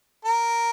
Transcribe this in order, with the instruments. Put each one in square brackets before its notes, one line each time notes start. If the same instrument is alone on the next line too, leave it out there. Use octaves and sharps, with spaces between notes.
[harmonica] A#4